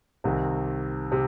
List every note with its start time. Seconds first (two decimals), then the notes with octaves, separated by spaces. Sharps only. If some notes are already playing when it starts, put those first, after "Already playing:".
0.24 C2 C3 D#3
1.12 C3